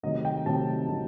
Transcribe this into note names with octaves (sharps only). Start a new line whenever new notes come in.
C3 D#3 F#3 A3 D#5
G5
C3 D#3 F#3 A3 A5
C3 D#3 F#3 A3